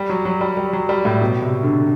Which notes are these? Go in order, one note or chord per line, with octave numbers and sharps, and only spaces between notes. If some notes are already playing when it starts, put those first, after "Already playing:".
Already playing: G3
F#3
F#3
G3
G3
F#3
G3
A2
B2
C3
D3